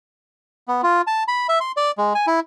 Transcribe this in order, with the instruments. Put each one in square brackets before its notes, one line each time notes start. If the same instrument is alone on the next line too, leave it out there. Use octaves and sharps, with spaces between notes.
[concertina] B3
F4
A5
B5
E5
C6
D5
G#3
G#5
E4